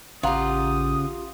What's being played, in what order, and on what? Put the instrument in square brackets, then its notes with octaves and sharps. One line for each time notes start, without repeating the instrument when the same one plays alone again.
[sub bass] A1 [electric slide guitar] C#3 F#5 A#5 [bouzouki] F4 G4 [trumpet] D#6